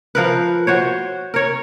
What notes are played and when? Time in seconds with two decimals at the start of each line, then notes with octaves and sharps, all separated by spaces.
0.15 F3 A#4 B4
0.67 F#4 C5 C#5
1.34 A#4 C#5